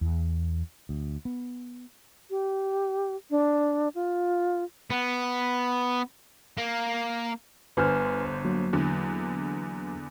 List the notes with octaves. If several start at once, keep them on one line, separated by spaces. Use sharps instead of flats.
E2
D2
B3
G4
D4
F4
B3
A#3
G1 D3 B4 C5 G#5 F6
F#3 A#3
E2 D3